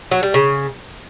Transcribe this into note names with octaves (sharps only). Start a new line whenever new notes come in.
F#3
G3
C#3